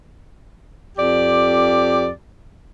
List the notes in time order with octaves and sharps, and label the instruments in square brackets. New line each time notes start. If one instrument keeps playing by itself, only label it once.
[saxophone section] F2 G4 D5